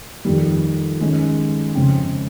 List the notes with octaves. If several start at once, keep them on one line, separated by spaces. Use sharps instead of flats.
F2 D#3 G3
D#3 G#3 C#4
F2 C#3 G#3 C4